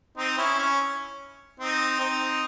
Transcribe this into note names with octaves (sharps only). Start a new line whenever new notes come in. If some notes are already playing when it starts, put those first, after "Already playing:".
C4 D#4
C#4 E4
C#4
C4 D#4
C4 D#4